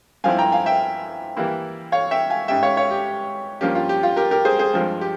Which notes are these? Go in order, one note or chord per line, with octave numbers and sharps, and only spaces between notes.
G2 F3 C4 E4 F5 G#5
G5 A#5
F5 G#5
E5 G5
E3 G3 A#3 E4
C#5 F5
E5 G5
F5 G#5
G#2 G3 C#4 E5 G5
C#5 F5
C#5 F5
G4
G2 F3 A#3 C#4 G4
F4
G4
F4
G4 A#4
G4 A#4
G#4 C5
G#4 C5
G2 F3 G#3 C4
G4